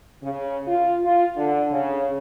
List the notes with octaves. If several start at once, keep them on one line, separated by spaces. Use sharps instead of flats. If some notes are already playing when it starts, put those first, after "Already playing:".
C#3
F4
F4
D3
C#3